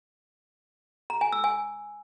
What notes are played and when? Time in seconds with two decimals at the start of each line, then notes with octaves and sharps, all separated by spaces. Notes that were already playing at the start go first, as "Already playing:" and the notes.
1.10 A#5
1.21 G#5
1.32 E6
1.44 G#5